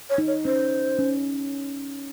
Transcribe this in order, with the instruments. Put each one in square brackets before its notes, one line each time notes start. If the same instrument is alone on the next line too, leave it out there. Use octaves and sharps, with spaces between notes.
[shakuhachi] C#5
[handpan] D#4
[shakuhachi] C#5
[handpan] C#4 [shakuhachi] C5
[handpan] C#4